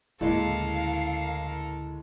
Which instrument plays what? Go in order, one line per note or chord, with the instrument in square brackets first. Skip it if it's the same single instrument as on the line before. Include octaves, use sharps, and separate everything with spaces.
[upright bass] D2 C#3 [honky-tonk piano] A2 G#3 A#3 [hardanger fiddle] A4 A#4 [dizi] F5